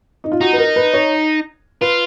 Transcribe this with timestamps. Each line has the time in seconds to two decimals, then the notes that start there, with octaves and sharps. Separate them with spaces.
0.24 D#4
0.32 F4
0.41 D#4 F#4
0.53 B4
0.58 A#4
0.76 B4
0.94 C#5
1.81 F4 B4